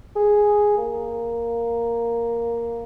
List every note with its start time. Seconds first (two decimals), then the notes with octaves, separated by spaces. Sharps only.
0.16 G#4
0.78 A#3